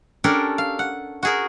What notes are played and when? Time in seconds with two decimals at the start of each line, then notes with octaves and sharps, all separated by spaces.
0.24 C#4 D4 G4 A4 A#4 D5
0.58 F5
0.79 F#5
1.23 F#4 G#4 A#4